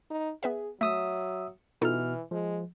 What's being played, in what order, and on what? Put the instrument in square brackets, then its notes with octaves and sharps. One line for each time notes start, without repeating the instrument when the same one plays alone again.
[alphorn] D#4
[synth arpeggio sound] B3 B4 E5 [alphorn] G#4
[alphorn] F#3 [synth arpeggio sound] A3 [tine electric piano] E5 D#6 E6
[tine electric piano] B2 F6 [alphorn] E3 [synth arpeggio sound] D#4 F4 A4
[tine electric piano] F3 [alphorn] G#3